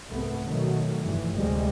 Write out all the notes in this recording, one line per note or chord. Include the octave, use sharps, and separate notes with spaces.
C2 G#2 A3 B3
B2 D#3 F#3 A3
F1 G2 E3
D2 C3 G3 G#3